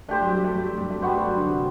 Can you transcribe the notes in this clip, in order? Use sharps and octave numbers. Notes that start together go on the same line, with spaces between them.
A3 D4 G4 C5
F#3
G3
A3
G3
F#3
G3
A3
G3 A3 B3 F#4 C5
A3
F#3
D3
C3